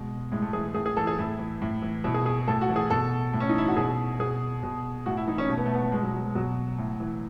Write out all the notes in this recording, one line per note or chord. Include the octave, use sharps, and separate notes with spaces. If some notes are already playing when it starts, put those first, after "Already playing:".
Already playing: B2 G#3
A2 G#3
A3
E3 G#4
A2 G#4
G#4
E3 A4
G#4
A2 E4
E3
A2
E3
B2 E4
G#4
G#4
A2 A4
F#4
E3
G#4
B2 A4
A2
C#4
D#4
E3 E4
F#4
B2 G#4
B2 G#4
B2
A2 F#4
E4
E3 D#4
C#4
B2 A3
B3
A3
B3
A3
B2 G#3
F#3
F#3
G#3
B2 F#3
A2
E3